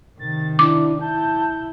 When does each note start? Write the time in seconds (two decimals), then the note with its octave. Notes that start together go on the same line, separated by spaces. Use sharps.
0.19 C3 D#3 A6
0.59 D4 E4 D6
1.01 E4 A5 G6